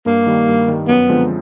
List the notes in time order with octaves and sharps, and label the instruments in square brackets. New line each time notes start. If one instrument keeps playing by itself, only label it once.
[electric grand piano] G2 [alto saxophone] A#3
[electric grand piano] D#3 G3
G2
D#3 G3
[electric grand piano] F#2 [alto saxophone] B3
[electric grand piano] D3 F3 G#3 C4